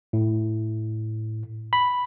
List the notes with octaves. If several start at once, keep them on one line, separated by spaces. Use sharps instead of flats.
A2
B5